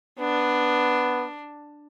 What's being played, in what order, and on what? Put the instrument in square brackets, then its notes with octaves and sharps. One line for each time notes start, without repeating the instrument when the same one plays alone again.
[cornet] B3 [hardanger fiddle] D4